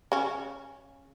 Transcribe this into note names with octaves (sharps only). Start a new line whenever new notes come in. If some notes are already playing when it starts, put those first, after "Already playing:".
C#3 C#4